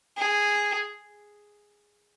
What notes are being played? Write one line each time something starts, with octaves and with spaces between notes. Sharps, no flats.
G#4